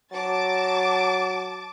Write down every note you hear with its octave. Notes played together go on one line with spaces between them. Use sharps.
F#3 A5 D6 A6